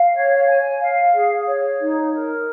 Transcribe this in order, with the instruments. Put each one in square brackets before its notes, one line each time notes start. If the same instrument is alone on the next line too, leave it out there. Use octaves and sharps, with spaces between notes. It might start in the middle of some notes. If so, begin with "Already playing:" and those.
Already playing: [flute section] F5
C#5
G#5
F5
G#4
C#5
D#4
A#4